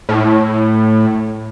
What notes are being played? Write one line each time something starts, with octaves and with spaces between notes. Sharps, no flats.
A2